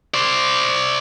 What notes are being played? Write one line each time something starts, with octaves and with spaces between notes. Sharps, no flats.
C5 D5